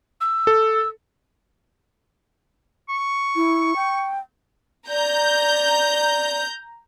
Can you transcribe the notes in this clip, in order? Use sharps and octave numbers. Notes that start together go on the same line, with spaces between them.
E6
A4
C#6
E4
G5
D5 A#5 G6